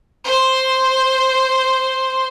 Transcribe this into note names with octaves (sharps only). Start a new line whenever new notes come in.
C5 C6